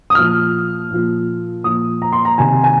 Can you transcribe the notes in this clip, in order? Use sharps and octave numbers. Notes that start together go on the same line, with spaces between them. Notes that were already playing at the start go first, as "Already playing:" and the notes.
D#6
A#2 F3 F6
A#2 F3
A#2 F3 D#6
A#5
C6
A#5
C3 D#3 G#5
G#5